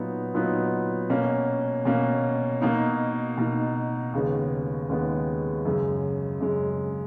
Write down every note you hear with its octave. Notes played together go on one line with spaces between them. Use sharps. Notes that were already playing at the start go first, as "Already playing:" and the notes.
Already playing: A#2 F#3 B3 D#4
A#2 F#3 B3 D#4
B2 A#3 C#4
B2 A#3 C#4
B2 A#3 D#4
B2 A#3 D#4
D#2 C#3 G#3 B3
D#2 C#3 G#3 B3
F#2 C#3 G#3
F#2 C#3 G#3